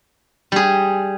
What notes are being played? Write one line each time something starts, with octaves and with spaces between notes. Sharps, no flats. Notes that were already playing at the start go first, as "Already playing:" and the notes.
G3 G#4